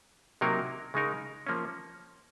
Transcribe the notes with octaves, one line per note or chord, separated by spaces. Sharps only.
C3 F#3 A#3 D#4 A#4
C#3 G#3 D#4 A#4
F3 A#3 C#4